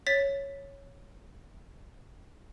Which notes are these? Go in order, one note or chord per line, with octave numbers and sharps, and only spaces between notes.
C#5 A6 B6